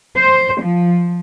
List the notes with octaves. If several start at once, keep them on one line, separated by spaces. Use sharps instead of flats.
C5
F3